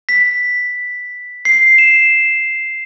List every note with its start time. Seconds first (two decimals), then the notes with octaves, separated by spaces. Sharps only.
0.09 B6
1.45 C7
1.78 E7